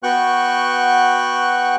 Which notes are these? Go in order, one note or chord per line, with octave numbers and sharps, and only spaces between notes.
B3 F#4 G5 C#6 F#6